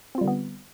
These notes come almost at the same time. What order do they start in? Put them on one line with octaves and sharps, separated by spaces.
C4 F4 G3 D3 B3